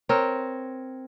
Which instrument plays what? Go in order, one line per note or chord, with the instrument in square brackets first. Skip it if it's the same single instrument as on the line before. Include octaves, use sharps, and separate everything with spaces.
[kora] C4 A#4 C#5